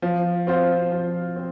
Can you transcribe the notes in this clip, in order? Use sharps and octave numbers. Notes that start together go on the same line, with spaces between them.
F3
C4 F4 C5
F3
C4